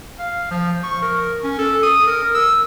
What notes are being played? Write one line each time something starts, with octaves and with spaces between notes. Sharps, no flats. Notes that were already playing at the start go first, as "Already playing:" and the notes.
F5
F3
C#6
A#4
C#4
A4
D#6
A#4
E6